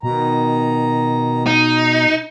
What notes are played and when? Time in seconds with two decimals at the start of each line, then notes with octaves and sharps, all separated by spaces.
0.03 B2 D#3 A#5
1.46 D#4